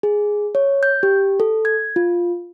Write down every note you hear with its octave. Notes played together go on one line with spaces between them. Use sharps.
G#4
C#5
G6
G4
A4
G#6
F4